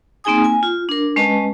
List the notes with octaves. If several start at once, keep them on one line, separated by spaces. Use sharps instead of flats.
A#3 C4 D#4 G#4 G#5 D#6
G#5
F4
D4 A#4
G#3 C#4 B4 D#5 A5